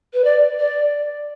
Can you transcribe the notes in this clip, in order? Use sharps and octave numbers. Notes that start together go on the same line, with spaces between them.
B4
D5
D5